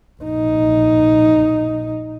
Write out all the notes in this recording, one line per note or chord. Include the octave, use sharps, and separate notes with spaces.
A#1 D#4